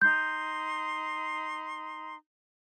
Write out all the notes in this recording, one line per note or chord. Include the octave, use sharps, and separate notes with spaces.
D#4 C6 G6